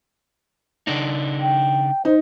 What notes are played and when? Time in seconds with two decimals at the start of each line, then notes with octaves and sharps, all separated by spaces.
0.87 C#3 D4 D#4
1.41 G5
2.05 D#4 C5